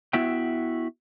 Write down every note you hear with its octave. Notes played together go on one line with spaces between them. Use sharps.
B3 E4 F#4 E5 G5